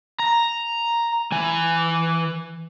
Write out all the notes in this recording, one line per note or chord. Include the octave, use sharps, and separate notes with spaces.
A#5
E3 G#5